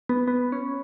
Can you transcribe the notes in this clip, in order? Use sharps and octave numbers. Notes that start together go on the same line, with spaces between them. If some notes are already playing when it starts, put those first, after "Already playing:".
B3
B3
C#4